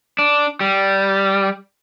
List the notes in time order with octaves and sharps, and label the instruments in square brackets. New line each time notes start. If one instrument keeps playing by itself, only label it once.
[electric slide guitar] D4
G3